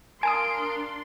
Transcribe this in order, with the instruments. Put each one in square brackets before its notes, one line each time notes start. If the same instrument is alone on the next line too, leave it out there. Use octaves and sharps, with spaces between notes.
[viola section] D4 C6 [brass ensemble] A#4 [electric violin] F5 D7 [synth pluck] G#5 A5 D#6